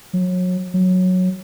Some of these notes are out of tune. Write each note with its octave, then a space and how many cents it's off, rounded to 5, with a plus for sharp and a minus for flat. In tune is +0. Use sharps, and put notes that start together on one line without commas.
F#3 -30
F#3 -10